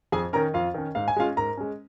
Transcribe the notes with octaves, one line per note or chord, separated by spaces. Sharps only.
F2 G#4 G#5
D#3 C#4 A#4 A#5
F2 F4 F5
D#3 C#4
G#2 F5
G#5
G#3 C#4 F4 F5
G#2 A#4 A#5
G#3 C#4